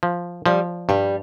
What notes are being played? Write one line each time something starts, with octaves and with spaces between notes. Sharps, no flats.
F3
F3 G3
G2 G3